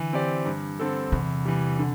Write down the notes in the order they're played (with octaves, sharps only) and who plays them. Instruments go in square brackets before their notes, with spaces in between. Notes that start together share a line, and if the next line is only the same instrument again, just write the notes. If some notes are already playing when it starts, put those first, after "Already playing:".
Already playing: [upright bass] D3 [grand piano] E3
[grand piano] C4 G4 D5
G2
D3 C4 A4
[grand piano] E2 [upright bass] C3
[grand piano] E3 G3
D3